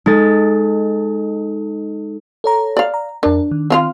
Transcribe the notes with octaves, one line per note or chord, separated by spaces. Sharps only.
G#3 D#4 A4 A6
A4 C#5 A#5
D5 F5
A#5
F2 D4 A#4
D#3
C4 F4 F5